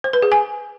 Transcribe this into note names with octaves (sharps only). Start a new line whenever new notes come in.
C5
B4
G#4
G#5